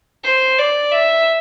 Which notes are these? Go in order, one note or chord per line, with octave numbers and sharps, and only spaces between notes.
C5
D5
E5